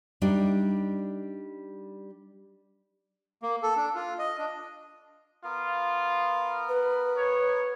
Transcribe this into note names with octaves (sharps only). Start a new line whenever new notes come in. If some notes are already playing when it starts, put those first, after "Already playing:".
G3 D4 D#4
A#3
A4
D4
F4
D#5
D4
B3 F4 A#4
B4
C#5